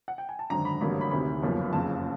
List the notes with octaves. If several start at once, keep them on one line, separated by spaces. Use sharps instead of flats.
F#5
G5
G#5
A5
G#1 F#2 D3 A#5
B5
A1 G2 D3 F#3 A#3 B5
B5
D2 C3 D#3 B5
G1 F#2 C#3 F3 A#3
F#1 F2 C#3 A5